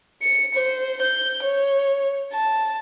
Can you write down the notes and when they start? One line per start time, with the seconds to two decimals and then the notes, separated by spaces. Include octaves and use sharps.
0.22 C#7
0.55 C5
1.02 G6
1.43 C#5
2.33 A5